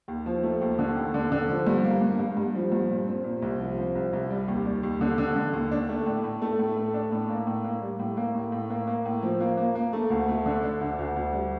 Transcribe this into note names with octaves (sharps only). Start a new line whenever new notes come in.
D#2
F3
A3
D#2
D3
D#2
D3
D3
F3
G2
A#3
G2
G2
G2
F3
G2
A#2
C4
A#2
C2
F3
F3
C2
C2
G3
D#2
G3
D#2
D3
D3
D3
D#2
D4
A3
A2
A2
A3
A2
A3
D4
A2
A#3
A2
A#3
G3
A2
A#3
A2
A2
A#3
A#3
A2
F3
A#3
A#3
A#3
A3
D2
A3
D3
D4
D2
D2
D2
G3